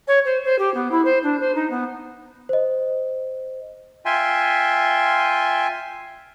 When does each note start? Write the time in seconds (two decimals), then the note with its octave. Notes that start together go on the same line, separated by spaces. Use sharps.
0.07 C#5
0.25 C5
0.44 C5
0.58 G4
0.74 B3
0.91 E4
1.05 C5
1.23 D4
1.40 C5
1.55 D#4
1.70 B3
2.49 C5 D#5
4.06 F4 E5 G5 G#5 C6